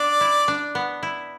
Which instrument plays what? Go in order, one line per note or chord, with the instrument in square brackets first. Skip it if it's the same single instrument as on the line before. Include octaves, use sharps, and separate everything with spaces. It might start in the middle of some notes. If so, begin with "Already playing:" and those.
Already playing: [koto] B3 D4 [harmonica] D5
[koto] E4
D4
B3
E4